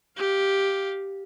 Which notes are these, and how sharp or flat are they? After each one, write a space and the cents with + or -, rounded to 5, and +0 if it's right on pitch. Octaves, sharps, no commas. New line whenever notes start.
G4 +0 F5 +5